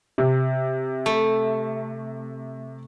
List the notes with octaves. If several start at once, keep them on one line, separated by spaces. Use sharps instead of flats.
C3
A3